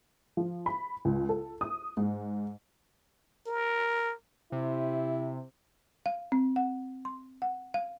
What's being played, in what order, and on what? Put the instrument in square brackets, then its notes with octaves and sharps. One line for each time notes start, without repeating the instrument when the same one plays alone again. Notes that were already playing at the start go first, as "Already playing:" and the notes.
[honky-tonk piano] F3
B5
C#2
A4
D#6
G#2
[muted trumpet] A#4
[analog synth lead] C3 [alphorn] E4
[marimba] F5
C4
F#5
C6
F#5
F5